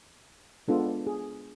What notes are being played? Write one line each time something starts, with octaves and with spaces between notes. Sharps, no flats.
G#3 B3 D4 F4 A4
G#4